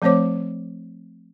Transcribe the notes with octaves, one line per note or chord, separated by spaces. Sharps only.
F3 A3 C4 C5 C#5 D6